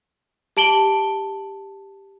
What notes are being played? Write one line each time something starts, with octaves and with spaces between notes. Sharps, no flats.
G4 A5 D7 F#7 G7